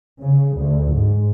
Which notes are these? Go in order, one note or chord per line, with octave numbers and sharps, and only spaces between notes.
C#3
D2
G#2